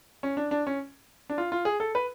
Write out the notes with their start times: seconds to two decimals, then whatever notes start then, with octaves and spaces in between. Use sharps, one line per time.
0.23 C#4
0.37 D4
0.51 D4
0.67 C#4
1.30 D4
1.38 F4
1.52 F4
1.65 G#4
1.80 A4
1.95 B4